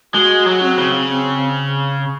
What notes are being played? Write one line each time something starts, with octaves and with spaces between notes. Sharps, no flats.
G#3 F#4
F#3
C#4
C4
C#3
C4